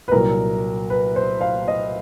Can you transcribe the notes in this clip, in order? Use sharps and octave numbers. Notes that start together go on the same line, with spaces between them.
B4
C2 A#2 F#3 A#4
B4
C5
F5
D#5